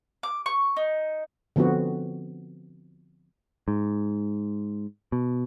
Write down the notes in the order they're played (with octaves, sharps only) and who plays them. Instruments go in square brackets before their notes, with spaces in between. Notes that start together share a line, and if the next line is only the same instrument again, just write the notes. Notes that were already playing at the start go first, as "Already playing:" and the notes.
[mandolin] D6
C#6
D#4
[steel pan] D3 F3 B3 C4 F#4
[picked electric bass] G#2
B2